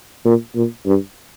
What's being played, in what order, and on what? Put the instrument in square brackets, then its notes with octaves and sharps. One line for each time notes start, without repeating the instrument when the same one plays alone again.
[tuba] A#2
A#2
G2